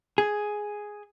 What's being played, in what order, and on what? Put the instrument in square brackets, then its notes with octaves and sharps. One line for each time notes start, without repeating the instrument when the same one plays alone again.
[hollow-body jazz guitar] G#4